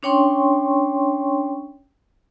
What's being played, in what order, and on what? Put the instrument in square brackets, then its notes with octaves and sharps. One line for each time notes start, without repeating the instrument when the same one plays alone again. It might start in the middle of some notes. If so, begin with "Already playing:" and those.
[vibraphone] C#4 D4 C#5 G5 C6 C#6